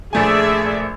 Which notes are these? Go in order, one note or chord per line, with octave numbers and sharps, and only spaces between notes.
A#1 A3 G#4 D5 E5 G#5